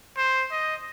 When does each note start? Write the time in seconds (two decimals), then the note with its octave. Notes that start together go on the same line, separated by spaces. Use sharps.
0.17 C5
0.52 D#5